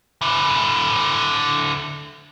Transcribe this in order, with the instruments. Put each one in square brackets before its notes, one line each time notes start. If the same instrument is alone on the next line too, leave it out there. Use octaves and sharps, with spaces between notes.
[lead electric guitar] D3 E4